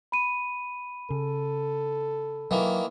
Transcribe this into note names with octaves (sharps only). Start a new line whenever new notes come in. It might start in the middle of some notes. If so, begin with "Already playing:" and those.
B5 D#7
C#3 A4
D#3 E3 F#3 A#3